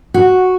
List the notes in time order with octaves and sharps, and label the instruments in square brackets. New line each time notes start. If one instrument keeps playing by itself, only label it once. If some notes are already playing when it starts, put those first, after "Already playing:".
[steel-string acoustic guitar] F#4